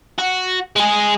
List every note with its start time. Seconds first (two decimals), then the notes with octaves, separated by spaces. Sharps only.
0.18 F#4
0.76 G#3 G#4